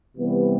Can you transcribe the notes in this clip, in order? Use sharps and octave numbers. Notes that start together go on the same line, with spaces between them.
C3 E3 G3 B3